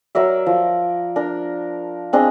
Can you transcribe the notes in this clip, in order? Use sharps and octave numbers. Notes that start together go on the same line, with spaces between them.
F#3 A#4 D5 E5
F3
D4 A#4
C4 D4 G#4 D#5